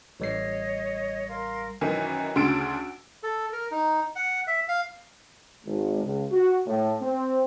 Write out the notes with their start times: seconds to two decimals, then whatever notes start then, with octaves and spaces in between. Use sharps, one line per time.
0.20 A1 G3 C#5 D#5 C7
1.29 A#4 F5 C6
1.81 F#2 D#3 E3
2.36 D2 C#3 C6 E6 A6 D7
3.23 A4
3.52 A#4
3.71 D#4
4.16 F#5
4.47 E5
4.69 F5
5.64 G#1
6.02 C#2
6.31 F#4
6.67 A2
7.01 C4